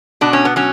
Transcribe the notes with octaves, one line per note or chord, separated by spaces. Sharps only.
B2 D4
C#4
B3
F#3 C#4